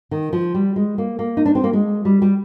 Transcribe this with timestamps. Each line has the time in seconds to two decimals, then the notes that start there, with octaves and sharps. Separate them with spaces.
0.11 D#3
0.33 F3
0.54 G3
0.76 G#3
0.98 A#3
1.19 A#3
1.37 D#4
1.45 D4
1.55 C4
1.64 A#3
1.73 G#3
2.05 G3
2.22 G3